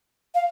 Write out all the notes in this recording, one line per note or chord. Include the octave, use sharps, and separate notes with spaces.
F5